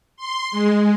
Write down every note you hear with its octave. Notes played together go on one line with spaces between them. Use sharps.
C6
G#3